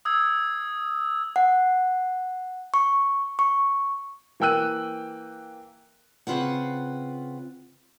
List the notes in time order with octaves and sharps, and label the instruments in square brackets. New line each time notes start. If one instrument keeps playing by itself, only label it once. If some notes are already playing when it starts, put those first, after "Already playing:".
[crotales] D#6 E6 G#6
[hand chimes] F#5
C#6
C#6
[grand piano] E3 A#3 G5 E6 F#6 D#7
[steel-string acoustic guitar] C#3 C4 F4 B4 F#5